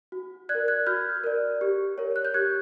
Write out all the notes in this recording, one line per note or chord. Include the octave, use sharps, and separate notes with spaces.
F#4
D5 F#6 G#6
A#4
F#6 G#6
F#4 F6 G6
A#4 D5
G4
A#4 C#5
F#6
G6
G4 F#6 G#6